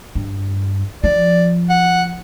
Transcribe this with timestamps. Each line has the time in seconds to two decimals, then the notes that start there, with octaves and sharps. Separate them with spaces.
0.15 G2
1.04 F3 D5
1.69 F#5